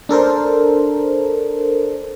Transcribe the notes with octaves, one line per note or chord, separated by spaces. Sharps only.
D4 A4 A#4 C5